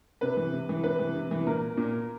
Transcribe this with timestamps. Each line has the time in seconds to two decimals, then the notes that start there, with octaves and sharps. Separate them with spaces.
0.21 C3 B4
0.37 E3
0.53 C3
0.69 E3
0.83 C3 B4
0.99 E3
1.15 C3
1.31 E3
1.46 A#2 A#4
1.77 A#2